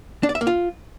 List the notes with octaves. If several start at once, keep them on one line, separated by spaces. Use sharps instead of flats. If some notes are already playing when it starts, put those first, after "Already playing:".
D4
D5
E5
A#3
F4